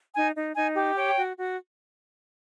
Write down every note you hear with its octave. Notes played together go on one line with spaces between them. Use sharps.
D#4 G#5
D#4
D#4 G#5
G4
C#5 G5
F#4
F#4